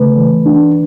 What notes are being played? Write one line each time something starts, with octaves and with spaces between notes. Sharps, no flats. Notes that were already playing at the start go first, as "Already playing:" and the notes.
Already playing: C#3 A3 B4
E3
D4